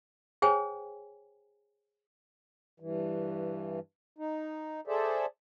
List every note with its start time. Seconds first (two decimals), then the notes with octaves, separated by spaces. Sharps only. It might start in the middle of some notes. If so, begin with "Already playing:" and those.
0.42 G#4 C5 C#5 G5 G#5
2.80 G2 E3
4.18 D#4
4.87 G#4 A4 C5 D5 E5